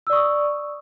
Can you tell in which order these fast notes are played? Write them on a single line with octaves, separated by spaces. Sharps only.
E6 D5 C#6 D#6